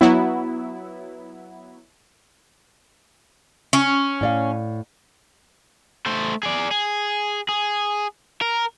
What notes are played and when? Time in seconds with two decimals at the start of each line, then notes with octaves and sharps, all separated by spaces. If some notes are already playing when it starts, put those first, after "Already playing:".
0.01 F#3 B3 E4
3.73 C#4
4.21 A2 D5 F5
6.06 A3 C5
6.43 G#4 D5
6.71 G#4
7.49 G#4
8.41 A#4